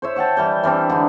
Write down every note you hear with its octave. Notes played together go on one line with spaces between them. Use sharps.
C5 C#5 E5
C#5 F#5 G5 A5
E3 G3 G5
E3 G3 C4 D4
D3 G#3 D#4